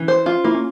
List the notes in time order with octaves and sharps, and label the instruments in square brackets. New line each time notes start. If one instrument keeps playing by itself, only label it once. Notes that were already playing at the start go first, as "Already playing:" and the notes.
Already playing: [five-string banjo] E3 [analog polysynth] C#4
[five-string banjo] C5
F4
[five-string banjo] A#3 [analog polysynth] E4
[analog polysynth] C#4